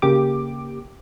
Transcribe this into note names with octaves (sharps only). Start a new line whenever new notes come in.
C#3 A#3 G4 D6